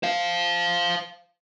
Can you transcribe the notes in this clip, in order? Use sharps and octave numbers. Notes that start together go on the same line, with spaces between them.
C5 F5